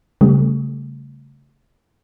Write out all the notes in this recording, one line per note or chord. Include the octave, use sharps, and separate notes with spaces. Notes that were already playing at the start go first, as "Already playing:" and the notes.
C#3 G3 A3